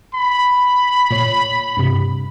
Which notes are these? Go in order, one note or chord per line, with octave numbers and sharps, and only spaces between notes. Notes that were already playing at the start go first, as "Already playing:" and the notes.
B5
A#2 C#5 C7
G2 C3